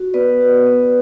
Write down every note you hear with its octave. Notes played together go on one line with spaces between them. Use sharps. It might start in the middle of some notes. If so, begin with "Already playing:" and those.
Already playing: F#4
B3 B4 D5
F#4
B3